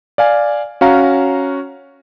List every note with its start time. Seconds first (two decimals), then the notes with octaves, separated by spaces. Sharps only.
0.18 D5 F5 G#5
0.81 C#4 F#4 F5 A#5